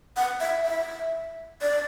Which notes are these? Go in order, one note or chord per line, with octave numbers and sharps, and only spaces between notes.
F#5
E5
E5
D5